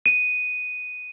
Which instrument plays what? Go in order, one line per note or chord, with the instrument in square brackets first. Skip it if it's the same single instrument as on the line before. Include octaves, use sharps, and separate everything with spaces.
[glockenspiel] D#7